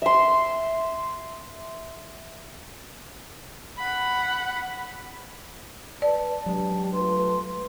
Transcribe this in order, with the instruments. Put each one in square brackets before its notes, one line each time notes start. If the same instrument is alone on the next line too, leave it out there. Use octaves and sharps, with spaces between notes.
[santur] E5 C6
[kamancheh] F#5 B5
[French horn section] B4 [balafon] D5 [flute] A5
[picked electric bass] F#3 G#3 [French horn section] D4 G4
[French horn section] A3 F4 B4 [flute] C6